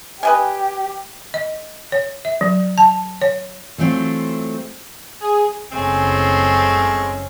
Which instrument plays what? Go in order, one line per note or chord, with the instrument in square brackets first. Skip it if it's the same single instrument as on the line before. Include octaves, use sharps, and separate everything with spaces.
[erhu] G4 [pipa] B4 D#5 G#5
[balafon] D#5
C#5
E5
F#3
A5
C#5
[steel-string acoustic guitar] E3 F#3 A3 C4 F4
[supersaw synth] G#4
[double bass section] F#1 C#4 [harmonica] G#3 A3 G#5 [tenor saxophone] C4